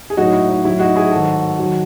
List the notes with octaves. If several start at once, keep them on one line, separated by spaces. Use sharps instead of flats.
G#4
A2 F#3 D#4 F#4
E4
D#4
A2 F#3 E4
D#4 F#4
E4 G#4
G#2 D#3 F#3 F#4 A4
D#3 F#3